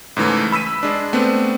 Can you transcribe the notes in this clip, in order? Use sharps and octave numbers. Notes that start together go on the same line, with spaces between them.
G#2 C#3 E3 A3
B5 E6 B6 D#7
G#3 D4
A3 B3 C4 D4